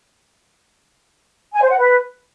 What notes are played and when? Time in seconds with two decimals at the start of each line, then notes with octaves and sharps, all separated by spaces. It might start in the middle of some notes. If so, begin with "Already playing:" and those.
1.53 G#5
1.61 C5
1.70 F#5
1.78 B4